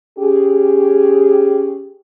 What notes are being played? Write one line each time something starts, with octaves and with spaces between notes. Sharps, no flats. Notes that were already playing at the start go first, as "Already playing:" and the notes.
C#4 G4 G#4